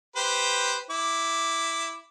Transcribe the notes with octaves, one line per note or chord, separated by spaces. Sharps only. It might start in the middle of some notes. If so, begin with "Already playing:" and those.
G4 B4 C5
E4 D6